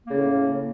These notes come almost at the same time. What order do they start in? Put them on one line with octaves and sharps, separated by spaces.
A#3 C#3 A2